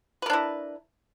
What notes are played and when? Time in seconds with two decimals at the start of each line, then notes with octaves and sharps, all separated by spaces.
0.22 B4
0.26 A#4
0.30 D4
0.33 E4